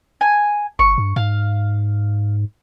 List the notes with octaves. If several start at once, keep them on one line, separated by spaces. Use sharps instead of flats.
G#5
G1 C#6
G2
G#2 F5